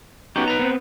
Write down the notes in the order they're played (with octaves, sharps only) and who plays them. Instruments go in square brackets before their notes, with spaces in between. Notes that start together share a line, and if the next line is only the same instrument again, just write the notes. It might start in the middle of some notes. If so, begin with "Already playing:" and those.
[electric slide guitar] B3 D#4 [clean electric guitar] C#4 F#4 G4
[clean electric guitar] B4 A#5
[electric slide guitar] B3 C4